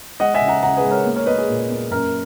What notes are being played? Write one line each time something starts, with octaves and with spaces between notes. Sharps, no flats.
G#3 D#5 F#5
E5 G#5
C#3
F#5 A#5
C#3 F#5 A#5
G#4 B4
G#3
A#4 C#5
A#3
A#4 C#5
A#3 B4 D#5
G#4
A#2
A#3
F#2 A#4